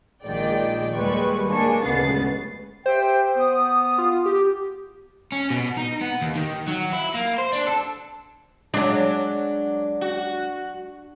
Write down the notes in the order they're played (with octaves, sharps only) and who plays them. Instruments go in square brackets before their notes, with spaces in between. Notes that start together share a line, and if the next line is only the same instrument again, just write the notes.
[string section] A#1 D#3 G#3 D5 G5
D#2 G3 G#3 B4 C#6
G#3 A#3 D4 G#5 C#6
D2 C#3 G#3 B3 A6 C7
[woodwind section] G4 E5 G5 [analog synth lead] C5
[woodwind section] B3 D#6
[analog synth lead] F4
G4
[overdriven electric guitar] C#4
B2
D#4
B3
D#2
D#3
F#3
E4
A#3
C5
D4
A4
[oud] F#3 G#3 [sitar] D4
[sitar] F#4